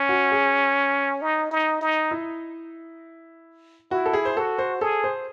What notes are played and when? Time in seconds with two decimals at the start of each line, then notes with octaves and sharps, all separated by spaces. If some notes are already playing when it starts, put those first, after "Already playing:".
Already playing: C#4
0.09 F#4
0.32 G#4
1.22 D#4
1.51 D#4
1.81 D#4
2.11 E4
3.91 E4 F#4
4.06 A4
4.13 G#4
4.25 C5
4.37 F#4 A4
4.58 C5
4.81 G#4 A4
5.04 C5